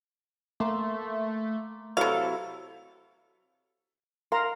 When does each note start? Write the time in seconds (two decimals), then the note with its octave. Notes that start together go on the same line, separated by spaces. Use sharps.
0.60 A3 A#3 C6
1.97 C3 F#3 E4 A4 B4 F5
4.32 A#4 F5 A#5 C6